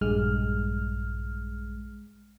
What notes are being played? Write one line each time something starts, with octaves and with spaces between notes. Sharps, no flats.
A#1 G2 G#3 F6